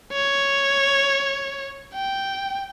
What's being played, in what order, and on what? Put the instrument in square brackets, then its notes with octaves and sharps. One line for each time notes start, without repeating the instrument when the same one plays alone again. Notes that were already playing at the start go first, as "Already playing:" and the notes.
[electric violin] C#5
G5